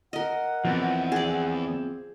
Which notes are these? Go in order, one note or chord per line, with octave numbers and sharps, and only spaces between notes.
A#4 D#5 F#5
E2 F3 C4
G#4 D5